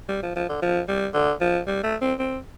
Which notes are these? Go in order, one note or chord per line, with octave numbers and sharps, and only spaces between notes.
G3
F3
F3
D3
F3
G3
D3
F3
G3
A3
C4
C4